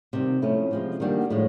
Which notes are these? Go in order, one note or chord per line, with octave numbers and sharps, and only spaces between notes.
C3 D#3 G3
F3 A3 C#4 E4
C3 F3 G#3
D#3 G3 A#3 D4 F#4
A2 F3 G#3